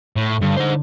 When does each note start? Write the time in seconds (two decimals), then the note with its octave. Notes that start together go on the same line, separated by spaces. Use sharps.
0.16 A2
0.41 G2 D3
0.56 D#4 C5